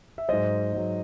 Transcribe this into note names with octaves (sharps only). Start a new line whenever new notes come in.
E5
G#2 F#3 C5 D#5
G#2 F#3